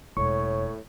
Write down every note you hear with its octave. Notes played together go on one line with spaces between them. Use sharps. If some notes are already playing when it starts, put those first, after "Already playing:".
E1 A2 C#5 C#6